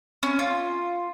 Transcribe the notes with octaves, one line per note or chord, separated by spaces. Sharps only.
C#4
F4